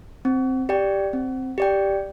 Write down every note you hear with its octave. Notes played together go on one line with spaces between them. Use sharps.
C4
G4 D5 G5
C4
G4 D5 G5